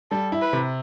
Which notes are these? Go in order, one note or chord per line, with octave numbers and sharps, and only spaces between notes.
G3 A4
E4
B4
C3